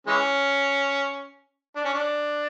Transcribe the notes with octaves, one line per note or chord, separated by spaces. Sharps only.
E3 G#3 C#4
D4
C#4
D4